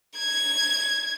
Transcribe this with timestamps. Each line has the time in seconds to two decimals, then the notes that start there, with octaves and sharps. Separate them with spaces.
0.18 G#6